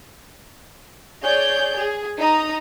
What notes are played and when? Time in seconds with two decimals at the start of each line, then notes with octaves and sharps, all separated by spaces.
1.23 G#4 C#5 D5 G6
1.76 G#4
2.19 D#4 A#5 D#6